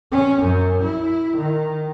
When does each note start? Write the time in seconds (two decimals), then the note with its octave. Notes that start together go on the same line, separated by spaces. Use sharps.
0.12 C#4
0.42 F#2
0.83 E4
1.37 D#3